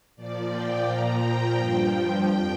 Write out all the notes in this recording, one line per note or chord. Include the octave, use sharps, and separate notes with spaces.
A#2 F3 D5
G5
A#2 F3 A#5
G5
G2 F3 G5
F2 G5